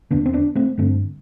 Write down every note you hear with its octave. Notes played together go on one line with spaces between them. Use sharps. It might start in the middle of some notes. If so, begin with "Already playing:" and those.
E2 D3 B3 D4
C4
B3 D4
A3 C4
G2 D3 A3 C4